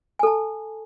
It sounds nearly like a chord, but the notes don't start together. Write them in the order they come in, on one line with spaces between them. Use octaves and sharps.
G#5 A4 A5